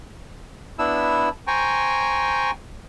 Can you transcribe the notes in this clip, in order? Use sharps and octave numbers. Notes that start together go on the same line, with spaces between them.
B3 D4 E4 E6
C5 G5 G#5 A#5 C#6